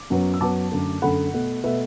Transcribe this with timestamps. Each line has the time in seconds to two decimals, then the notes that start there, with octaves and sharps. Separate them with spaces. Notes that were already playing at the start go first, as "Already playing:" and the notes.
Already playing: D6
0.10 F#2 F#3 B3
0.34 E6
0.41 F#2 F#3 B3 A5 D6
0.72 F#2 D3 A3
1.02 F#2 D3 A3 F#5 B5
1.33 B2 A3
1.64 B2 A3 B4 E5